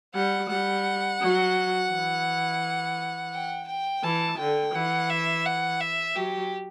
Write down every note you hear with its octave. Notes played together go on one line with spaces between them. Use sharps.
G3 F#5
G3 F#5
F#3
E3
G5
G5
E3 A5
D3 G5
E3 F#5
E5
F#5
E5
F#3 G4